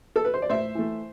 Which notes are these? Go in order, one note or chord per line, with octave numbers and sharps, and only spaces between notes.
A4
B4
C5
D5
A2 C5 E5
E3 A3